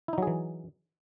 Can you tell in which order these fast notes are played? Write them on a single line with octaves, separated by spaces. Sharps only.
E4 D#4 F#3 G#4 E3